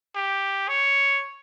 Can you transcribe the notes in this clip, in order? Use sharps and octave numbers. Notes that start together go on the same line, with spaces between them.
G4
C#5